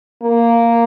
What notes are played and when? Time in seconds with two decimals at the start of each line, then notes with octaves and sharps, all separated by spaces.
0.23 A#3